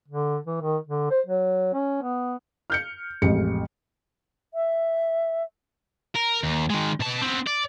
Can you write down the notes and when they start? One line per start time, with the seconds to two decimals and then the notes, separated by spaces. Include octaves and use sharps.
0.08 D3
0.47 E3
0.61 D#3
0.87 D3
1.11 C5
1.27 F#3
1.73 C#4
2.02 B3
2.70 F6 G6 C#7
3.22 A1 F2 G#3 C#7
4.54 E5
6.15 A#4
6.43 D#2
6.70 D#3 G#3
7.00 B2 A5
7.22 B3 C4
7.47 D5